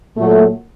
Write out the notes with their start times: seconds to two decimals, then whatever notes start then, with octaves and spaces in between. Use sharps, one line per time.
0.17 A#2 F#3 A3